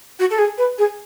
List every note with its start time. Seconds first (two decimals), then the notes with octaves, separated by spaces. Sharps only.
0.19 F#4
0.30 A4
0.38 G#4
0.58 B4
0.78 G#4